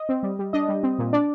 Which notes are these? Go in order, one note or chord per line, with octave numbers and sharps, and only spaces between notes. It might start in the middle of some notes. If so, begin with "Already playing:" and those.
Already playing: D#5
C4
G3
G3
D4 D#5
G3
C4
A#2
D4 D5